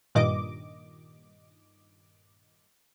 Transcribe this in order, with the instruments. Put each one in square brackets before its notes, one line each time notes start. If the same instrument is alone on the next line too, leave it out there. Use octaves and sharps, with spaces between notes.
[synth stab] G2 A#2 D#3 D#5 D6